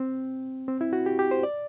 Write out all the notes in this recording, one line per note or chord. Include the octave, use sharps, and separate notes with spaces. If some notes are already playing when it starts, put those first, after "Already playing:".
Already playing: C4
C4
E4
F#4
G4
G4
C5
D5